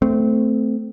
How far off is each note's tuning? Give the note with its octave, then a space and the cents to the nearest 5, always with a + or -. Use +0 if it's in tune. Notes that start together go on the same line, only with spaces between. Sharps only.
A3 +0 C4 -20